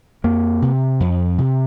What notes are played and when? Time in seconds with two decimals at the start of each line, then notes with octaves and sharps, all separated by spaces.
0.24 F2 A#3
0.62 C3
1.00 F2
1.38 C3